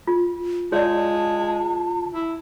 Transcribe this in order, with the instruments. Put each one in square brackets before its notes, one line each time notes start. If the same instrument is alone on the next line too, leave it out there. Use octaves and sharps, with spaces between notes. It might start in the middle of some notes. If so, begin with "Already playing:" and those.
[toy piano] F4
[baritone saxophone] G#3 [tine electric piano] F4 [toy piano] C#5 D5 [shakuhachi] A5
[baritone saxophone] E4